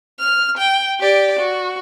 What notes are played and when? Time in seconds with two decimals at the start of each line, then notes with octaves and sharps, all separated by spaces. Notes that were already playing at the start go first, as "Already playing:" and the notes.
0.19 F6
0.58 G5
1.00 G4 D5
1.39 F#4